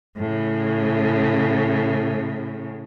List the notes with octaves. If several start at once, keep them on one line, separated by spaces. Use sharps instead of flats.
A2 C#3